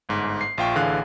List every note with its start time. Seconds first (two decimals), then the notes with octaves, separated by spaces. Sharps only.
0.09 G1 G#2
0.41 C7
0.58 A#1 F4 G5 C#6
0.75 A1 D3 E3 G#4 F5 F#6